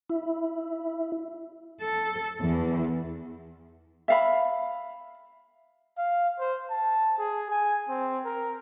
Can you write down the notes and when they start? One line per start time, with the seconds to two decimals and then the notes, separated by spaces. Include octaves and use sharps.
0.10 E4
1.81 A4
2.41 E2 E3
4.08 E5 F5 B5
5.98 F5
6.39 C5
6.70 A5
7.18 G#4
7.50 G#5
7.89 C4
8.25 A#4